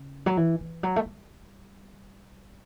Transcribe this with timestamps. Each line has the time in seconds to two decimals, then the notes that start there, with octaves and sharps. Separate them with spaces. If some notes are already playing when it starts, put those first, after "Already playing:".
Already playing: C#3
0.26 F#3
0.37 E3
0.60 E3
0.83 F#3
0.96 A3
1.05 G3